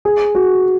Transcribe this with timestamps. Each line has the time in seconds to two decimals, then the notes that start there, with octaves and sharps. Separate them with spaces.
0.05 G#4
0.35 F#4